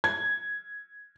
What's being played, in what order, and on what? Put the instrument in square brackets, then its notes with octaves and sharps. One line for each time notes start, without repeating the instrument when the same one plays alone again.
[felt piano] G#6